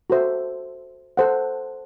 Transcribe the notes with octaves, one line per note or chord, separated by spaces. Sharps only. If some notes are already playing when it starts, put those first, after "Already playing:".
F#4 A4 C5 E5
A4 C5 F#5